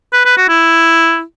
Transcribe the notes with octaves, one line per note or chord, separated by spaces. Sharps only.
B4
B4
F#4
E4